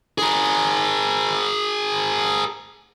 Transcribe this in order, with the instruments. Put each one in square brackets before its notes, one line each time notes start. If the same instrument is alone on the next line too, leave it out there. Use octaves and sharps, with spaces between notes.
[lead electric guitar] G#4 A#4